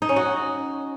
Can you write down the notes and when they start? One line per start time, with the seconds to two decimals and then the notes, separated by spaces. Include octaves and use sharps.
0.02 D#4
0.09 C#4
0.16 F#4